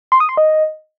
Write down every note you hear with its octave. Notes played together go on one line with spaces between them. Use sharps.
C6
D#6
C6
D#5